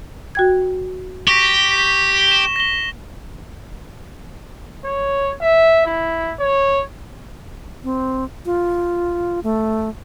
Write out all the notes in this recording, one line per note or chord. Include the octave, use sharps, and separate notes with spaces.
F#4 G5 G#6
G4 C#6 A#6 B6
E7 G7
A#6 G7
C#5
E5
E4
C#5
C4
F4
A3